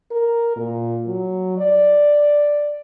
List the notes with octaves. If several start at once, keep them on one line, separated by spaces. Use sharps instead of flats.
A#4
A#2
F#3
D5